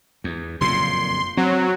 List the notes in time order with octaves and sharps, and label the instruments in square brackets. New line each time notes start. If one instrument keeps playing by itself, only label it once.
[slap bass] E2
[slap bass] F#1 F2 A#2 [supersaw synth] C6
[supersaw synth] F#3 [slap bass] C4